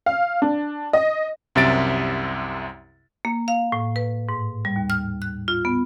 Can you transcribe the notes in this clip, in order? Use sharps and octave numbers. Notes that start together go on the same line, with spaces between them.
F5
D4
D#5
C2 F#2 C3 E5 A6 D7
A#3
F5
A2
B4
G#2
G3
D#2
F6
F#6
F4
B3